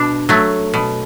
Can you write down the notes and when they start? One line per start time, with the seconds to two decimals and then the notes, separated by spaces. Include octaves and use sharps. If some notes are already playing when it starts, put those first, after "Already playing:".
Already playing: B2 D4
0.29 F#3 A3
0.74 B2